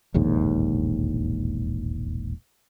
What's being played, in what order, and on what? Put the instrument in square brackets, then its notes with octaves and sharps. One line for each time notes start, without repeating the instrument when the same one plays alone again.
[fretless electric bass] E1 A#1 D#2 G#2